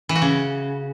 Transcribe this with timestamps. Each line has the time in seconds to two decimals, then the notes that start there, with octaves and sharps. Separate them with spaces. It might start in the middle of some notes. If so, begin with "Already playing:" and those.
0.09 E3
0.15 F#4
0.22 C#3